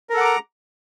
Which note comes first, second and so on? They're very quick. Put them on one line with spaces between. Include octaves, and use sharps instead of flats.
A#4 A4 F#5 D6 A#5